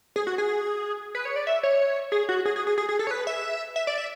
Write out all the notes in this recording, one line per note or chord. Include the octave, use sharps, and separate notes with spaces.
G#4
F#4
G#4
B4
C#5
D5
E5
C#5
G#4
F#4
G#4
G#4
G#4
G#4
G#4
A4
C#5
B4
E5
E5
D5
E5